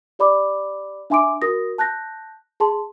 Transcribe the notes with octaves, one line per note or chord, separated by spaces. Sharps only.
G4 D5 B5 D6
D4 E5 G#5 C6 D6 D7
F#4 A#4 D#6 A#6
A5 F#6 G6 A#6
G#4 A5 C6